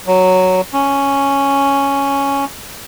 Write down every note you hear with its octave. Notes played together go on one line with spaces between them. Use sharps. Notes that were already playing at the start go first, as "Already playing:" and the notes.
F#3
C#4